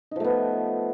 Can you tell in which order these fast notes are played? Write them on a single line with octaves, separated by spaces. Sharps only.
D#4 F3 A3 B3